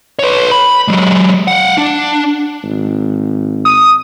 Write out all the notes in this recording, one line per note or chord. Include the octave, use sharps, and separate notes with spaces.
B4 C#5
B5
F#3 G#3
F5 F#5
D4
G#1
D#6